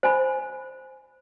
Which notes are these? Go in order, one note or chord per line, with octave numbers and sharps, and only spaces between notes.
C5 G#5 B5